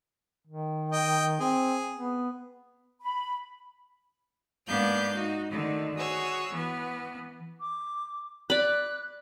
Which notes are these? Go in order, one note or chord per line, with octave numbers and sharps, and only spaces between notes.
D#3
D#5 G5
C4 G#4
B3
B5
G#2 A#3 B3 D4 F5 G6
D#4 F#4
D3 D#3 A3 D#4
F#4 G#4 C#5 E6
E3 B3
D6
D5 B5 F#6